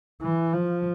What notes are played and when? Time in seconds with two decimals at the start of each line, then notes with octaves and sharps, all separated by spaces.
0.22 E3
0.54 F3